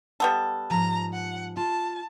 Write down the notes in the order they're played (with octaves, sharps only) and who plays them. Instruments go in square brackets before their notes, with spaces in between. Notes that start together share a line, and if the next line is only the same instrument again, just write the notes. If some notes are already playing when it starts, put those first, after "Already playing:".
[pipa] G3 B3 A4
[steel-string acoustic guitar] G#2 F3 G#5 [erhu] A#5
[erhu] F#5
[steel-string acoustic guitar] F4 [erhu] A5